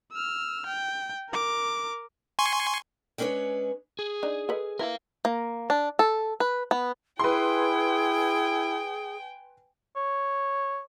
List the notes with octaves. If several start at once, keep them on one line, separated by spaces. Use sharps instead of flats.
E6 F6
G5
A#4 D6
G#5 C6 C#6
G#3 C#4 D4 B4 C#5
G#4
D4 D#4
A4 B4 D#5
E4 A#4 B4 F5
A#3
D4
A4
B4
B3
E4 G#4 B4 G5 G#5 C6
C#5